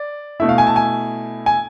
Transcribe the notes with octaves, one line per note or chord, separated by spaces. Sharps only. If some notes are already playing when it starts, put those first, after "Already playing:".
Already playing: D5
B2 A3 E4 E5
F5
G#5
A5
G#5
G#5